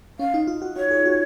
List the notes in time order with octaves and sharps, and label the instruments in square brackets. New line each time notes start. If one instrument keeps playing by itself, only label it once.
[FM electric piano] C#4 [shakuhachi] F5
[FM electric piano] D#4
F4
F#4
[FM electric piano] F#4 [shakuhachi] C#5
[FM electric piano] G#4
F#4